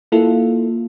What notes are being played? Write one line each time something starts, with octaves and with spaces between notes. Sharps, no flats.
A#3 E4 F4 A4